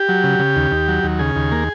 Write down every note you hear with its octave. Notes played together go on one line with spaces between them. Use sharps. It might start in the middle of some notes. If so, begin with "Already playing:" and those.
Already playing: G4
F#3
C#3
C#3
D#2
D#2
F#3
D#2
C#3 G#4
D#2
A#3